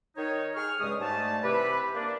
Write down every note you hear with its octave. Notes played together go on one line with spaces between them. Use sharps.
D#3 D#4 C#5
G#4 C#6 F6
G2 C#3 G#3 D#6
G#2 G3 A3 G#5 A5
C3 E3 G4 B4
A#3 D4